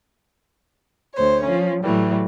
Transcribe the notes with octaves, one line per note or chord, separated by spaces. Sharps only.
D2 C5 C#5
F3 C#4
A2 E3 F#3 G3 A3